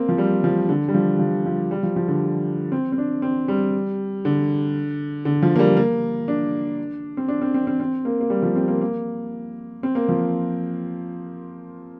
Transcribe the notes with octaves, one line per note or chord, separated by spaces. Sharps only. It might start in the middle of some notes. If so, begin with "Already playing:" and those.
Already playing: A#3 C4
F3
G3
F3
D3
G3
F3
F3
F3
G3
F3
F3
D3
C4
C4
D4
C4
G3
D3
D3
F3
A#3
G3
A#3
D4
C4
D4
C4
C4
C4
C4
A#3
A#3
G3
F3
C4
A#3
A#3
C4
A#3
F3